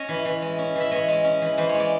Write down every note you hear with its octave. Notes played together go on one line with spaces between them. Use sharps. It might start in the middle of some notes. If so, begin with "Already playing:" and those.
Already playing: C#4 C#5 D#5
E3
E3
G#3
C#4
E3 E5
E3 C#5 D#5
G#3
C#4
E3
E3 C5
G#3 C#5
D5